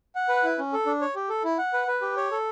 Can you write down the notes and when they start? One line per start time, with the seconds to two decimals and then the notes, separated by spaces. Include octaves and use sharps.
0.15 F#5
0.29 B4
0.44 E4
0.59 C#4
0.73 A4
0.86 D4
1.01 C#5
1.16 G4
1.29 A4
1.44 E4
1.58 F#5
1.73 B4
1.87 B4
2.01 G4
2.17 C#5
2.31 A4